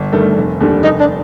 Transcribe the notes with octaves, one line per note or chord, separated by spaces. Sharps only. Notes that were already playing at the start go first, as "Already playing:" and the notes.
Already playing: G1
G2 D#3 A3
F1
D#2 D3 G3
F1 D#4
D4